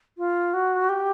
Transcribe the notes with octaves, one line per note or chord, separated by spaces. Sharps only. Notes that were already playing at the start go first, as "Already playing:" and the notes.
F4
F#4
G4